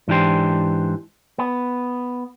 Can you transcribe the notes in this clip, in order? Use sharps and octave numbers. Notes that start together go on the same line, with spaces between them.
G#2 E3 D4 G4 C5
B3